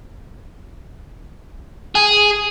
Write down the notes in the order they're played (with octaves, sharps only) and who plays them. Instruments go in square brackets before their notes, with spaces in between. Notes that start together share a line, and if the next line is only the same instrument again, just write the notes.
[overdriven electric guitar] G#4